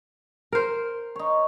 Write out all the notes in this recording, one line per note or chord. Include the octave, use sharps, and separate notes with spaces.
A#4 C5
D#4 C#5